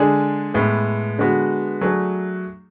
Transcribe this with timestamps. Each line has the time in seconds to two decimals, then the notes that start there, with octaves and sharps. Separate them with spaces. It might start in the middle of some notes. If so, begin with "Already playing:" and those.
Already playing: D3 G#3 D4 G#4
0.54 A2 G#3 B3
1.18 D3 G#3 B3 F#4
1.81 F#3 A3 D4 G#4